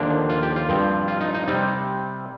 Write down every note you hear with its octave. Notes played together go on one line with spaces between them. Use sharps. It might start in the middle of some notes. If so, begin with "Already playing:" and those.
Already playing: D#2 D3 F3 A#3 D4
F4
G4
F4
G2 F3 C4
F4
D#4
D#4
C3 G3 C4 D#4